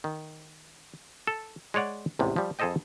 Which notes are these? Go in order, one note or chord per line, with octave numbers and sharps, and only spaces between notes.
D#3
A4
G#3 G#4 C#5 D5 F#5
A1 E2 G#2 C3
F3 G3
F2 G#4 A4 C5 D#5 G5